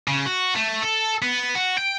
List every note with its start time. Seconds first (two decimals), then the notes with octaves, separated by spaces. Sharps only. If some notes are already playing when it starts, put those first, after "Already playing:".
0.08 C#3
0.26 F#4
0.56 A3
0.82 A4
1.22 B3
1.55 F#4
1.78 G5